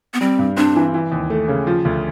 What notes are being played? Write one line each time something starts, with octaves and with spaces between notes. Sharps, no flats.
B3
G3 C4
G2
C4 D4
E3
E3
D#2
A3
C#3
F3
D2